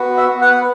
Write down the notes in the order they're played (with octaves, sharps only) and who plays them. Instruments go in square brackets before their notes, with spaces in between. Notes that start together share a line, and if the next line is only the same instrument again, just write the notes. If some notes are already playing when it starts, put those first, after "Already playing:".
Already playing: [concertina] B3 F#4
E5
B3
F#5